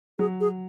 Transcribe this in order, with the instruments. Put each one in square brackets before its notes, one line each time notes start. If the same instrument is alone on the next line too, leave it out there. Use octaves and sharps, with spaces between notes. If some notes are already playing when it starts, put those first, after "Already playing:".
[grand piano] F#3 [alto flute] G#4
[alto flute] G#4